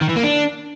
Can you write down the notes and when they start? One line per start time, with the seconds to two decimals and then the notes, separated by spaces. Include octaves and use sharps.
0.02 D#3
0.09 E3
0.17 A#3
0.24 D4